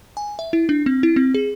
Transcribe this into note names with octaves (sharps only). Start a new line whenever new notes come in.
G#5
E5
E4
D4
C4
E4
C4
G#4